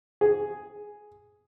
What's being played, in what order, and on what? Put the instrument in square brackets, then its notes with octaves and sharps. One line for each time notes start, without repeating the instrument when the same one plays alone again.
[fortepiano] G#4